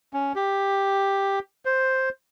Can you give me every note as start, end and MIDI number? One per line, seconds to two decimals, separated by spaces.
0.13 0.33 61
0.36 1.39 67
1.65 2.09 72